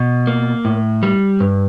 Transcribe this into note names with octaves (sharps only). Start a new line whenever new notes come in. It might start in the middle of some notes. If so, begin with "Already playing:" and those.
Already playing: B2
A#3
A2
G3
G2